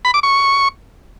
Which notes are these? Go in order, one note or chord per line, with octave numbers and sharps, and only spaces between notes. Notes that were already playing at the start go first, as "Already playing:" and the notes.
B5
D6
C#6